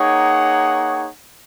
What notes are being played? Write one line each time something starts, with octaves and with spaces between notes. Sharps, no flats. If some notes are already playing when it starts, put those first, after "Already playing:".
Already playing: A#3 D#4 G#4 C#5 F#5